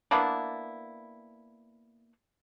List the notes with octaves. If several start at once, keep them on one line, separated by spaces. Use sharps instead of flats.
A#3 B3 D4 E4